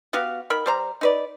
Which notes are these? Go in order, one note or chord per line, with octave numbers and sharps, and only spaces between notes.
B3 F#4 G4 F5
D#3 A#4 B5
G3 C5 A#5
D#4 B4 D5